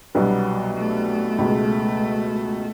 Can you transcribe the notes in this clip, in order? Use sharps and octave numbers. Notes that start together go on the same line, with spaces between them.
C2 B2 F#3 G3 B3 D4
A3
C#2 B2 G#3